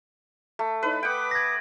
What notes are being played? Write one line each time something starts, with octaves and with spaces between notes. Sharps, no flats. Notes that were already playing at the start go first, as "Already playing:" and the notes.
A3
D#4 E4 B4 C#5
B4 F#5 G5 D6 D#6
G#6 A#6